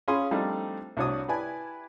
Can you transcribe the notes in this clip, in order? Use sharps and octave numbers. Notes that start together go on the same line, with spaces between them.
C#4 F4 G#4 F5 B5 C6
F3 G3 A3 C4 D4 D#4
C2 D4 F#4 C#5 D#6
E4 G4 B4 D5 G#5 A5